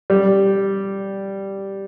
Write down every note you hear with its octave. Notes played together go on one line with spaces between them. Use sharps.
G3